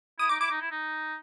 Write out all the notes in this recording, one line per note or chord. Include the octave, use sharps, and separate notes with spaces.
E4 D#6
D#4 D6
E4 D6
D#4
E4
D#4